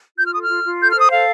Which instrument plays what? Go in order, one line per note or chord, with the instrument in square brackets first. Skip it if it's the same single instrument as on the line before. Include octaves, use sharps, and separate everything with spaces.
[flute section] F4 G6
F6
A4 D#6
F6
F4
F4
A4 G6
F6
C5
D#6
A4 F5